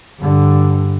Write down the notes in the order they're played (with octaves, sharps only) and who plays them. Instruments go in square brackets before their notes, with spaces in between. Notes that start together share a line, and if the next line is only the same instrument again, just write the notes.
[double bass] G2 D3